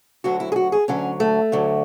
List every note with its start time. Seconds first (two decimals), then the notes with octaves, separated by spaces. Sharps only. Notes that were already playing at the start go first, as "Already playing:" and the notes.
0.24 D2 D3 F#3 F#4
0.40 E4
0.52 G#4
0.56 F#4
0.72 G#4
0.88 D2 D3 F#3 C#4
1.20 A3
1.52 D2 D3 F#3